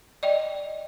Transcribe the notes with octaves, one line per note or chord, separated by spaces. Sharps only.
D5 D#5 G5